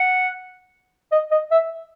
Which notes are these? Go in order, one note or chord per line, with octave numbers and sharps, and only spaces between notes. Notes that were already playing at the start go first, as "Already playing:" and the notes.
Already playing: F#5
D#5
D#5
E5